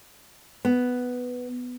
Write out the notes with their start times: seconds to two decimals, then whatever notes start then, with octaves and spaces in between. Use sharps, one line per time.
0.65 B3